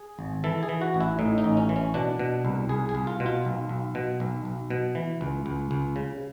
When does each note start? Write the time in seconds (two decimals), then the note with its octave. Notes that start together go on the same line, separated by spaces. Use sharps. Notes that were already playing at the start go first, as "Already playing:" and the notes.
Already playing: G#4
0.19 G#1
0.44 E3 A4
0.63 G#4
0.69 E3
0.82 F#4
0.94 A1
1.00 E4
1.19 A2 D#4
1.38 D#4
1.44 A1
1.57 C#4
1.69 E3
1.76 C#4
1.94 B2 D4
2.19 B2
2.45 C2
2.69 C2 G#4
2.89 G#4
2.95 C2
3.07 F4
3.20 B2
3.26 F4
3.45 B1
3.69 B1
3.95 B2
4.20 B1
4.45 B1
4.70 B2
4.95 E3
5.21 C#2
5.46 C#2
5.71 C#2
5.96 C#3